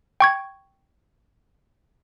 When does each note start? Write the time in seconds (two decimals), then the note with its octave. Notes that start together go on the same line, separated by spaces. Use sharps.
0.20 G5 C#6 G#6